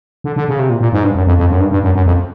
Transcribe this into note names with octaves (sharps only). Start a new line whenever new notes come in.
D3
D3
C#3
C3
A#2
A#2
G#2
G2
F#2
F2
F2
F#2
G2
G2
F#2
F#2
F2